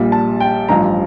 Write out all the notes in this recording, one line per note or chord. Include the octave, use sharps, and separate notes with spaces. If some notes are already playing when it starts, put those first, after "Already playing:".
Already playing: A#1 A#2 G3
A5
G5
A1 G2 F3 A#5